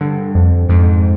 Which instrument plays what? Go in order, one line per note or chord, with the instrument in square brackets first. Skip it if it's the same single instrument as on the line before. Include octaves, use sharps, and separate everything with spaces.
[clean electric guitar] G2 [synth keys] D3
[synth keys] F2
[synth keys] F2 [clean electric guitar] G#2